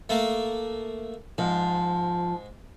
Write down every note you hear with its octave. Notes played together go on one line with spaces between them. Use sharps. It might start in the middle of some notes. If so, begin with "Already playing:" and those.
A3 A#3
G#2 F3